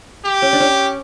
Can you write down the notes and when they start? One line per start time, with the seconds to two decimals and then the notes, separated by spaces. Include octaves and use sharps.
0.25 G4
0.42 C#4
0.53 D4
0.60 C#4